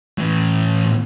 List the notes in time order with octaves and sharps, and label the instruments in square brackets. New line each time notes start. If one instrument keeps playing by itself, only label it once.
[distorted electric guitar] A2 E3